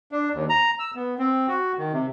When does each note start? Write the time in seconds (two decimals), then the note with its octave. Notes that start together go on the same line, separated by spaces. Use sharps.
0.12 D4
0.34 D#2
0.49 A#5
0.79 E6
0.95 B3
1.18 C4
1.48 F#4
1.78 D#3
1.92 C3